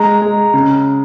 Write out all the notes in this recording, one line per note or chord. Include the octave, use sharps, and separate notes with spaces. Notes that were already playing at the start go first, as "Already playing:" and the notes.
Already playing: G#3 A#5
G#3
C#3